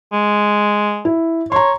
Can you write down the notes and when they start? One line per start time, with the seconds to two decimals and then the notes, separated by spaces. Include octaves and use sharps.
0.13 G#3
1.05 E4
1.52 C#5 A#5 C6